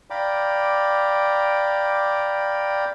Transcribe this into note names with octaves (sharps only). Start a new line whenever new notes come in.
D5 F5 G5 A#5 B5 D6